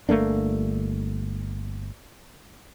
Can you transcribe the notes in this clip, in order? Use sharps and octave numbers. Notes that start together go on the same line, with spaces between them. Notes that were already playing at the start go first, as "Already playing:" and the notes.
G1 A3 A#3 D4